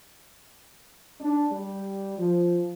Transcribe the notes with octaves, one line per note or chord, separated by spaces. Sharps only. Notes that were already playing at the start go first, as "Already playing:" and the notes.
D4
G3
F3